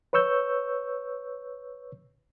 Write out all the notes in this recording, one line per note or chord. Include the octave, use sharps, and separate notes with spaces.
B4 C#5 C#6 E6 G6